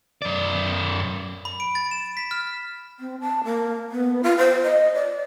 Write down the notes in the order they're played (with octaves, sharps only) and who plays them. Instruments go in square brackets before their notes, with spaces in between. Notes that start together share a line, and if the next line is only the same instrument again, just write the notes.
[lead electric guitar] F#2 D5
[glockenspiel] B5
D7
A6
E7
B6
F6
[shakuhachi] C4
A5
A#3
B3
F4
C5
D#5
D5